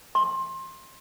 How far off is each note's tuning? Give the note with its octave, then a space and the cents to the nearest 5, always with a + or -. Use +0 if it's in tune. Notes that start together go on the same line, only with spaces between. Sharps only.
C6 +25